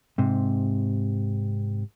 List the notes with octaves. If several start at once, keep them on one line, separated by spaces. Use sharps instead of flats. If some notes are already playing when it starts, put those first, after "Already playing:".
G#2 C3